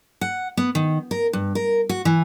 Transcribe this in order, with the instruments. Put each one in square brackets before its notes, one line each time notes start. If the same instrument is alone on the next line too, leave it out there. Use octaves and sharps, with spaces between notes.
[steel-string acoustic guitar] F#5
B3
D#3
A#4
G2
A#4
F#4
E3